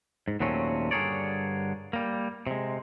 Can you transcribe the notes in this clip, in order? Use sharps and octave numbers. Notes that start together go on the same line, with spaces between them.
G#2
D#2 A#2 F#3 A3 C4 C#4
G2 D3 G#4 A#4 C#5 D5
G3 A#3
C3 G#3